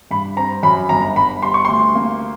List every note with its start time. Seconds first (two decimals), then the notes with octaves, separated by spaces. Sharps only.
0.11 G2 B5
0.37 C4 A#5
0.63 F#2 B5
0.89 G1 A#5
1.16 G1 B5
1.42 G3 C6
1.54 C#6
1.65 D2 C6
1.95 A#3